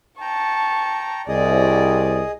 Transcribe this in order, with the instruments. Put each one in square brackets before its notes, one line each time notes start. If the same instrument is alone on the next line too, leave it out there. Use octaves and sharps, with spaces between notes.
[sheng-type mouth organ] G5 A#5 [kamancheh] A5 C#6
[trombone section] C2 [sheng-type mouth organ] G#4 D#5 [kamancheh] D5